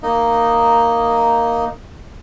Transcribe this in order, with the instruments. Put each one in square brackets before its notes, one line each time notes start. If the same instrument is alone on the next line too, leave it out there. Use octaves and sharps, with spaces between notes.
[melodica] A#3 D#4 D#5